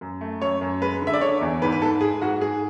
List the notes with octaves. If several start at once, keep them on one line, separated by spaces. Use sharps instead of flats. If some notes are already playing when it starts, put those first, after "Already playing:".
F#2
A3
F#2 C#5
F#2
G#3 B4
D3
E5
D5
D3 C#5
E2
G#2 B4
B4
G#2 A4
G#3 G#4
G#2 F#4
G#2 G#4